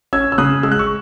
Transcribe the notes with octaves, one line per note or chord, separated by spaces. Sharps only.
C#4 E6 G#6
E6
C#3 D#6 F#6
G#3 E6
F#6
C#6 E6